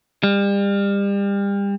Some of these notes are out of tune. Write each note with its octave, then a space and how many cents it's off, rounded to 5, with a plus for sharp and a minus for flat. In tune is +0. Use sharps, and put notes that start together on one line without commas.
G3 +35